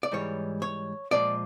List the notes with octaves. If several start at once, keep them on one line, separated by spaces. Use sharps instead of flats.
D5
G#2 E3 G3 C#5
C#5
A#2 F3 G#3 D5